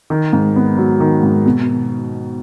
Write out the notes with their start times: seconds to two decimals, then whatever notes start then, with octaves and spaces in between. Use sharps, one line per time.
0.10 D#3
0.33 G#2
0.56 B3
0.78 F#3
1.00 D#3
1.23 G#2
1.46 B2